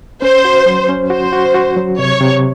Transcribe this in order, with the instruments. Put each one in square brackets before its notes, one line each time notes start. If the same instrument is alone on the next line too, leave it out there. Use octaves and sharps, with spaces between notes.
[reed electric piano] C#4 [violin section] C5
[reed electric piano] F#4
F#3
C#4
[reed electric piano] F#4 [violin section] C5
[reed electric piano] F#4
F#4
F#3
[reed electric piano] C3 [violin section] C#5
[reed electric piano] C3